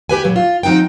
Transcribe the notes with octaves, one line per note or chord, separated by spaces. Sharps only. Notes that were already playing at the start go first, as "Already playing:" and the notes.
G4 B4 G#5
A#2 F#3
F4
F3 C4 D#4 F#5 G5